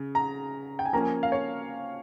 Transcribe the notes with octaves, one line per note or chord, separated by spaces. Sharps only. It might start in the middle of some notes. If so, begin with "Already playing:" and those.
Already playing: C#3
A#5
G5
G#5
F3 A#3 C#4 A#5
G#5
F5
C#5